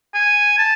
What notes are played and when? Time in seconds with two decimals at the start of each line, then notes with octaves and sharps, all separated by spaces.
0.14 G#5
0.59 A5